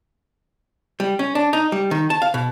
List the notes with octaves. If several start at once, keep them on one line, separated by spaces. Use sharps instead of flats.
G3
C#4
D4
D#4
G3
D#3
A5
F5
B2